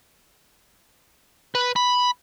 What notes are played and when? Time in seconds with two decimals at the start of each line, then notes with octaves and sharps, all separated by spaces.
1.55 B4
1.76 B5